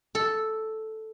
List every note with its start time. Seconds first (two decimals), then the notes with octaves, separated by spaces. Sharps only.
0.15 A4